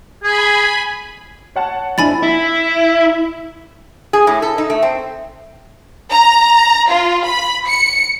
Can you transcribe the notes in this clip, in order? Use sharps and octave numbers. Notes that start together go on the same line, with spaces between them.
G#4 G#5 B5
C#5 F#5 A5
F2 D4 E4 G#5 B5 A6
E4
G#4
A2
A4
D#4
A3
C4
A#5
F4
B5
C#7